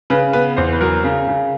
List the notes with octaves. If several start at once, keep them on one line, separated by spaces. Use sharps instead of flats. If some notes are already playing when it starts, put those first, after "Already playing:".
C#3 B4
B3 B4
E2 C5
B4
F#3 A#4
C#3
C#3